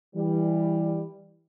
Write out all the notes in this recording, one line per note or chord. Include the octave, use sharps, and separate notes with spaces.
E3 G3